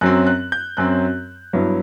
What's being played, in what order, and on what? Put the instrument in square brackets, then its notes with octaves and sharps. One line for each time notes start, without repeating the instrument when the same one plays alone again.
[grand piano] F#2 F#3 C4 F#6
F#6
G6
F#2 F#3 C4 F#6
G2 F#3 B3 E4